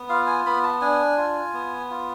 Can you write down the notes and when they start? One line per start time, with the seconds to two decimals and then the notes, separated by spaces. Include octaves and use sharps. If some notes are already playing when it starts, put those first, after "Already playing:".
Already playing: B3
0.09 F4 F5
0.27 G#5
0.46 B3 B5
0.64 A5
0.81 D4 G#5
1.17 F4
1.54 B3
1.90 F4